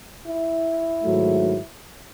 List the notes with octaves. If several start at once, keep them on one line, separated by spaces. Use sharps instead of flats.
E4
G#2 D#3 F#3 A3